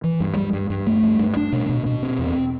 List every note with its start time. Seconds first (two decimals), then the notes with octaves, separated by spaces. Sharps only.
0.04 E3
0.20 G2
0.37 G3
0.53 G2
0.70 G2
0.87 A3
1.03 G2
1.19 G2
1.37 D4
1.52 B2
1.69 B2
1.86 B2
2.02 C4
2.19 E2